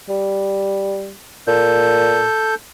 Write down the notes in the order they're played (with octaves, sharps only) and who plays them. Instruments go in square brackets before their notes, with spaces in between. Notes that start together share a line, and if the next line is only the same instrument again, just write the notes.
[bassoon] G3
[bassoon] A#2 [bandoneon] A4 G6